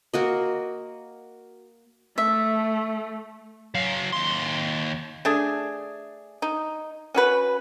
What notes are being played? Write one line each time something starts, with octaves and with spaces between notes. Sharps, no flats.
A#3 F#4 D#5
A3 E5
F#3 F5
D#2 C6
A3 D4 G#4
D#4
C#4 F#4 B4